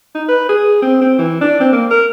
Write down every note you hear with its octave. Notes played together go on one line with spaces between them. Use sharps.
D#4
B4
G#4
C4
C4
E3
D4
C4
A#3
A#4